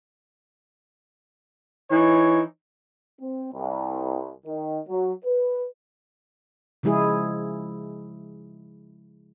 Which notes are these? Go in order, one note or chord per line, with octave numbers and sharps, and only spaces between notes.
E3 D#4 C#5
C4
C2
D#3
F#3
B4
C#3 F3 G#3 E4 G#4